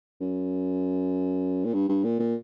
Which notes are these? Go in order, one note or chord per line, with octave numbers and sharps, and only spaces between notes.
F#2
A#2
G2
G2
A#2
A#2